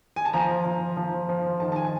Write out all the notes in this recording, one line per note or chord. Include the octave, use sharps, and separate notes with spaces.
G#5
A5
F3 A#5
F3
F3
F3
D#3 A5
A5
G#5